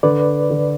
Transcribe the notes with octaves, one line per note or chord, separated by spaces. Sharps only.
D3 B4 D5
D3